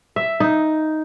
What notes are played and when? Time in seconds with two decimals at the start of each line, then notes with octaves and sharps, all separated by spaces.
0.16 E5
0.40 D#4